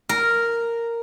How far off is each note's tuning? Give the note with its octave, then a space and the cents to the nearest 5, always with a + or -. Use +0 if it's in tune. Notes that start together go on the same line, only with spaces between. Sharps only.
A#4 -5